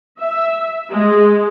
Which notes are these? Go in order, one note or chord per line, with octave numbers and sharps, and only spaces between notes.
E5
G#3